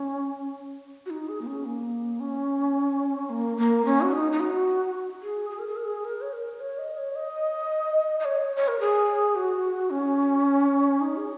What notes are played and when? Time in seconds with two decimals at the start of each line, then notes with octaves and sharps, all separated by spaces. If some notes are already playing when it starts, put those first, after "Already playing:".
Already playing: C#4
1.06 F#4
1.10 D#4
1.28 G#4
1.41 A#3
1.47 C#4
1.65 A#3
2.20 C#4
3.30 A#3
3.57 A#3
3.85 C#4
4.01 F#4
4.12 D#4
4.32 D#4
4.40 F#4
5.22 G#4
5.50 G#4
5.59 A#4
5.67 G#4
5.76 A#4
5.85 G#4
6.05 A#4
6.21 C#5
6.33 A#4
6.60 C#5
6.78 D#5
6.97 C#5
7.15 D#5
8.19 D#5
8.25 C#5
8.56 C#5
8.68 A#4
8.80 G#4
9.36 F#4
9.90 C#4
11.01 D#4
11.17 G#4